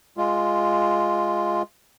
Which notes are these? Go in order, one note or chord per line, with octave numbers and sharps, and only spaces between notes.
G#3 F4